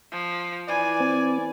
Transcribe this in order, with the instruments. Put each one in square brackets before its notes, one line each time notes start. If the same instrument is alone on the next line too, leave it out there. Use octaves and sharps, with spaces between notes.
[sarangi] F3
[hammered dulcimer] E3 [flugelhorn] D5 [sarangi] G#5
[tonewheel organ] C4